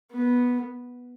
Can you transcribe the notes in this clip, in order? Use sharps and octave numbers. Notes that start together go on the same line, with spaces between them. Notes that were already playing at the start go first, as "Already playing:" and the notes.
B3